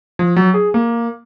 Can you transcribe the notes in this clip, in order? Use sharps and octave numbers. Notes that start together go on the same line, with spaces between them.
F3
F#3
G#4
A#3